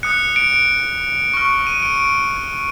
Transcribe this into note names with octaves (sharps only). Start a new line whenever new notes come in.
D#6 F#6 C#7
D7
C#6 F6
D#7
D7